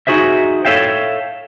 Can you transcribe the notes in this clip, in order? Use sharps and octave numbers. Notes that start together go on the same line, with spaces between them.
D#4 F#4 G#4 C5 E5
A4 A#4 C#5 E5 F5 G5